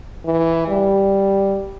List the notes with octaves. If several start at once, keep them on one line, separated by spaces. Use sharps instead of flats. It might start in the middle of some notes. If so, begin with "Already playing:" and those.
E3
G3